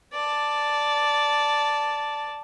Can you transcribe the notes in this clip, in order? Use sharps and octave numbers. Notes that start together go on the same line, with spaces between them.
D5 A5